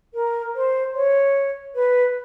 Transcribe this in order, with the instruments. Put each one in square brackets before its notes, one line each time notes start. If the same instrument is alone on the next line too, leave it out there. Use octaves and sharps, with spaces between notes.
[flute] A#4
C5
C#5
B4